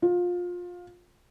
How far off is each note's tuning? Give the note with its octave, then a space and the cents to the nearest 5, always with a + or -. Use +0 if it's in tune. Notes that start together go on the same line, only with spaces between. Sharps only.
F4 +25